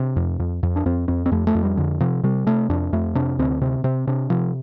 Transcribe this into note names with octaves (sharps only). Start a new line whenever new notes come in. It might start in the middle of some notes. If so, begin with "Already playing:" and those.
Already playing: C3 D4
F2
F2
F2
D4
F2 C4
F2 C4
C4
F2 A3
A3
F2
G3
F2 D3
C3 F3
C3 G3
C3 A3
F2 D4
F2 A3
C3 D4
D2 C4
C3 C4
C3 C4
C3 D4
C3 F3